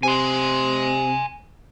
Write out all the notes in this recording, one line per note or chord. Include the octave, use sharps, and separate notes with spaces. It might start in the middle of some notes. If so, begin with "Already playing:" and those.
C3 G#5 C6